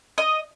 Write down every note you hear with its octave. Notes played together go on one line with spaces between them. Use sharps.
D#5